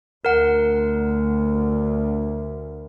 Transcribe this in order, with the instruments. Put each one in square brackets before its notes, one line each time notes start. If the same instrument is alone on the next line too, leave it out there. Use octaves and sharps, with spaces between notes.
[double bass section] D2 [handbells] A#4 F#5